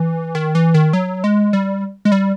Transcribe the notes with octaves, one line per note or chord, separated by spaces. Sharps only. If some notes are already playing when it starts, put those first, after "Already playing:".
Already playing: E3
D#3
E3
D#3
F#3
G#3
G3
G#3
G3